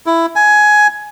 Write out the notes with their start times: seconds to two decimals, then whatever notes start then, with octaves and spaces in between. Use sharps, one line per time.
0.06 E4
0.36 G#5